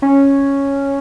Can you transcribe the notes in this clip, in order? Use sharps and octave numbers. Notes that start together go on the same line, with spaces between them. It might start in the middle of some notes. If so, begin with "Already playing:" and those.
C#4